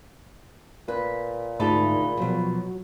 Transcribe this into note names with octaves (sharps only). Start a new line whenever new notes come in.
A#2 B4
D2 G#2 D#4 F4 G#4 A5 B5
B2 F3 F#3